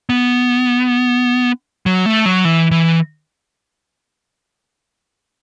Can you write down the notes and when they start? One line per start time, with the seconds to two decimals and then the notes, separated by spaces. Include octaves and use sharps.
0.09 B3
1.86 F#3
2.06 A3
2.25 F#3
2.45 E3
2.71 E3